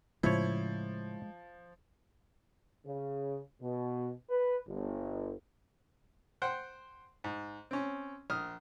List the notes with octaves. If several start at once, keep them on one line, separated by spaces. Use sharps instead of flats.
A2 C#3 F3 G#3 E4 C#5
C#3
B2
B4
G1
C5 F#5 G5 C6
G#2
C4 C#4
A#1 D#6 F6